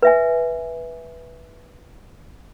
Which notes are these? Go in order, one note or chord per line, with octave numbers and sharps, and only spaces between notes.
B4 E5 G#5